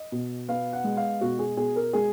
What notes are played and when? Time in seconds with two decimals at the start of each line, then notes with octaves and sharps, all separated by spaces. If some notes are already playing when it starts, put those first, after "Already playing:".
Already playing: D#5
0.12 B2
0.49 B3 F5
0.73 F#5
0.84 G#3
0.97 F5
1.21 B2 F#4
1.39 G#4
1.57 B2 G#4
1.76 A#4
1.93 G#3 G#4